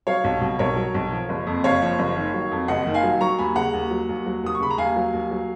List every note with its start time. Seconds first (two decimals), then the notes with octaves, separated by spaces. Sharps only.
0.07 F#3 C#5 F5
0.24 B1
0.41 B2
0.59 B1 A#4 C#5
0.76 F#3
0.94 B1
1.12 F3
1.29 F#1
1.47 F2
1.64 F#1 C#5 F5
1.82 F3
1.99 F#1
2.16 D#3
2.34 F#3
2.52 F2
2.68 F#1 D#5 F#5
2.87 D#3
2.94 F5 G#5
3.03 F#3
3.21 F#3 A#5 C#6
3.38 D#2 G#5 B5
3.55 C#3 F#5 A#5
3.73 D#2
3.91 F#3
4.09 D#2
4.26 F#3
4.43 D#2 D#6
4.55 C#6
4.60 C#3 B5
4.71 A#5
4.78 D#2 F5 G#5
4.96 F#3
5.13 D#2
5.31 F#3